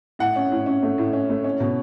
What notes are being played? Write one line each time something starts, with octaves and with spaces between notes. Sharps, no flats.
A2 F#5
C#4
A2
C#4
A3
A2
C#4
A3
C#4
B2